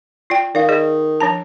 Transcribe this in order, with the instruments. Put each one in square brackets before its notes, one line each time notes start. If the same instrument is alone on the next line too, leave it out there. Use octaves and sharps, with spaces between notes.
[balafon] F4 D5 G5
[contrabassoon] D#3 [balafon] D5 F5
[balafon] G#4 D5 D#5
F3 D4 A5